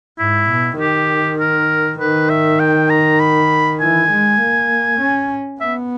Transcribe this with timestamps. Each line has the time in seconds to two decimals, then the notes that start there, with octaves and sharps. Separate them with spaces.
0.19 G#2 E4
0.50 B2
0.79 D#3 G4
1.39 A#4
2.00 D#3 B4
2.30 E5
2.60 G5
2.90 A#5
3.20 B5
3.80 E3 G#5
4.10 G#3
4.40 A#3
5.00 C#4
5.61 B3 E5